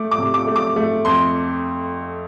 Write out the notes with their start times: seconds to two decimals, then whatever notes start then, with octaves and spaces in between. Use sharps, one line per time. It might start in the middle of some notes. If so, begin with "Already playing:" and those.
Already playing: A3 D6
0.11 D6
0.18 C3
0.34 D6
0.47 A3
0.56 D6
0.76 A3
1.05 F2 C6